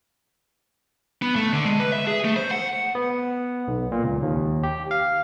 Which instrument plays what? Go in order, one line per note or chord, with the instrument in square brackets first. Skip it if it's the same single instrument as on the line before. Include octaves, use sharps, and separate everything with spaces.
[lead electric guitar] B3
A3
D3
G#3
B4
E5
G#4
A3
C5
F#5
[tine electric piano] B3
B1
A#2
C#2
D#2
G4
F5